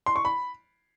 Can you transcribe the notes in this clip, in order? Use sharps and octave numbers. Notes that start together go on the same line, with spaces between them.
C6
C#6
B5